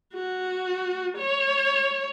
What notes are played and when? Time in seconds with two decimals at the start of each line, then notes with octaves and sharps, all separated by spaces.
0.14 F#4
1.18 C#5